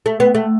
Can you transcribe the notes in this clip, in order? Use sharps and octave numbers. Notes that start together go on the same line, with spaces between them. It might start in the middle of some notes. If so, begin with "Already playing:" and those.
A3
B3
A3